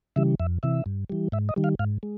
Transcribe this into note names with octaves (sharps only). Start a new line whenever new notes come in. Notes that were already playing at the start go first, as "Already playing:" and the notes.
C#3 E3 G3 E5
F2 E5
C3 E3 E5
G2
E3 G3
G#2 E5
D#5
D#3 G3
F5
G#2 F5
G#3